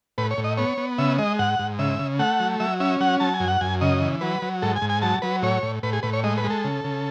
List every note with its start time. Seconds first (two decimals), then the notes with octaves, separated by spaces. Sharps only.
0.18 A2 B4
0.31 C#5
0.38 A2
0.44 D#5
0.57 B3 C#5
0.77 B3
0.98 C#3 E5
1.18 G#3 D#5
1.39 G#2 F#5
1.59 G#2
1.79 C#3 E5
1.99 C#3
2.19 A3 F#5
2.40 F#3
2.60 F#3 E5
2.80 C#4 E5
3.00 F#3 F#5
3.20 F#3 A5
3.34 G#5
3.40 F#2
3.48 F#5
3.61 F#2 G#5
3.81 C#3 D#5
4.02 E3
4.21 F#3 B4
4.42 F#3
4.62 G#2 A4
4.76 G#5
4.82 G#2
4.89 G#5
5.02 F#3 A5
5.22 F#3 B4
5.42 A2 C#5
5.63 A2
5.83 A2 B4
5.93 G#4
6.03 A2 B4
6.13 C#5
6.24 G#3 D#5
6.38 B4
6.44 G#3
6.50 A4
6.64 C#3
6.84 C#3